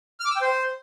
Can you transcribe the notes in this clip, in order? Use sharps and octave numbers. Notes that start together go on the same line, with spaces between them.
F6
D6
E6
G5
C5